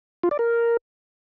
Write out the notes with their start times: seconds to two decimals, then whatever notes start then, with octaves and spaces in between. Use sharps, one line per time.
0.23 F4
0.31 D5
0.39 A#4